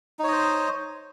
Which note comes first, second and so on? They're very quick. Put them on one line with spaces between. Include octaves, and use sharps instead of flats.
D#4 C#5 D#5 C5